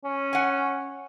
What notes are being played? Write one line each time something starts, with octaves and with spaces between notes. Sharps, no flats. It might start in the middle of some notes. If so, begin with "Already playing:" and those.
C#4
F#5 G#5